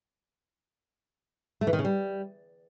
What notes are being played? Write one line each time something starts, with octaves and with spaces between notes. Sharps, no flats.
A3
E3
D#3
C#3
G3